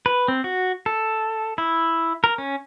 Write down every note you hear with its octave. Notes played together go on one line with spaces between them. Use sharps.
B4
C4
F#4
A4
E4
A#4
C#4